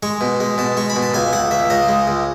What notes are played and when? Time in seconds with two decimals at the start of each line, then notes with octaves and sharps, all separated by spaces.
0.03 G#3 C#6
0.21 B2
0.40 G#3
0.58 B2 A5
0.77 G#3 C#6
0.90 B5
0.96 B2
1.02 A5
1.14 C#2 G#5
1.33 C#2 F#5
1.51 C#2 E5
1.70 C#2 D#5
1.89 G#3
2.08 C#2